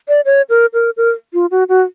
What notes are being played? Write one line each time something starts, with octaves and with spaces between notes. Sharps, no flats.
D5
C#5
A#4
A#4
A#4
F4
F#4
F#4